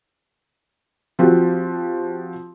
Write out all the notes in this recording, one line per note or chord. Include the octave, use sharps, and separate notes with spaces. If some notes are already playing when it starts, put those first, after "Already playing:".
F3 C4 F#4 G4